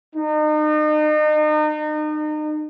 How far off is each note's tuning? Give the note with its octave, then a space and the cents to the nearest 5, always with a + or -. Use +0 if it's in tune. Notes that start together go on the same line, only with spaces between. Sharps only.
D#4 -35